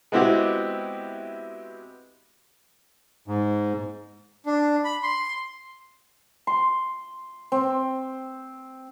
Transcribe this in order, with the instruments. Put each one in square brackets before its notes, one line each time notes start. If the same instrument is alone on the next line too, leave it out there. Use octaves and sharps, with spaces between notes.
[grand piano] G#3 B3 C4 E4 F#4 G4
[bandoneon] G#2
[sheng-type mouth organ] D4
B5
C6
[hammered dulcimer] C6
C4